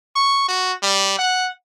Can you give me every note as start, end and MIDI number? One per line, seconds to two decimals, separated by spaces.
0.16 0.45 85
0.48 0.73 66
0.82 1.14 55
1.18 1.49 78